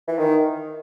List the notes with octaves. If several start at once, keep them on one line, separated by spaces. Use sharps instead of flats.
E3
D#3